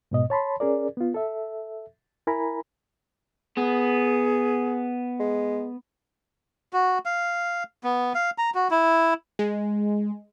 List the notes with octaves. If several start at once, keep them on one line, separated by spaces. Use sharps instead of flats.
G#2 B2 D#5
C#5 A5 B5 C6
C#4 G#4 A#4 D5
B3 F4
A4 E5
E4 A#4 G#5 A#5 B5
B3 G#4
G#3
F#4
F5
B3
F5
A#5
F#4
E4
G#3